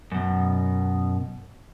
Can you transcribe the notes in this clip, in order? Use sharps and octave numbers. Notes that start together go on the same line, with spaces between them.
F#2 B2